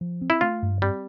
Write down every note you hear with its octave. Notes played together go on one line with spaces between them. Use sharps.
F3
C4
E4
A3 F4
G2
G3 C4